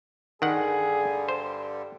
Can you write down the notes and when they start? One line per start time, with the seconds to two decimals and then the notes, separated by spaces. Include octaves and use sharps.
0.42 G2 D3 D#3 G3 G#4 F#5
1.29 C5